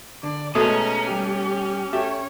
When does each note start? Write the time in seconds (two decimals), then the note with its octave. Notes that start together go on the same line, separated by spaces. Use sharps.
0.23 D3 D5
0.55 B2 G#3 A3 C#4 G#4 A#5
1.11 G3 G4
1.93 G4 A4 C#5 E5